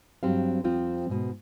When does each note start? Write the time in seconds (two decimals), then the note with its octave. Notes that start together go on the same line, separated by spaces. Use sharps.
0.23 G2 F#3 C4 G4 F5
0.64 F2 F3 C4 F4 G5
1.09 G#2 B2